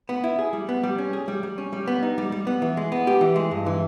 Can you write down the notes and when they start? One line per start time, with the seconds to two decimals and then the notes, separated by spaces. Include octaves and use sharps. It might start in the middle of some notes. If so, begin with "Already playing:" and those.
0.09 B3
0.24 E4
0.39 G#4
0.53 G3
0.69 B3
0.83 G3
0.98 C#4
1.13 G#4
1.28 G3
1.43 G3
1.58 C#4
1.73 G3
1.88 B3
2.03 D#4
2.18 G3
2.32 G3
2.47 B3
2.62 E3
2.77 G#3
2.92 B3
3.07 G4
3.21 E3
3.36 G#3
3.51 G2
3.66 E3